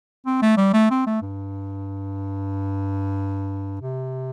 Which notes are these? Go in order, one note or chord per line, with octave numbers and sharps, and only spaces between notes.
C4
A3
G3
A3
C4
A3
G2
C3